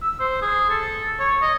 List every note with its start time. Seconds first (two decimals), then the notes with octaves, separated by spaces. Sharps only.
0.02 E6
0.20 C5
0.42 G#4
0.70 A4
1.20 C#5
1.42 D#5